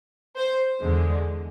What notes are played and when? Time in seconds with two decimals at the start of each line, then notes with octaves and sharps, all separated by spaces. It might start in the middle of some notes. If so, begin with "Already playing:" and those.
0.37 C5
0.82 E2 D3 G#3